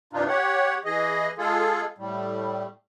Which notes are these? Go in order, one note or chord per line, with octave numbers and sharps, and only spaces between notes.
G2 C3 E3 D4 D#4 F4
G4 C#5 F#5
E3 G#4 D#5
G#3 F4 G#4 A4
A2 G3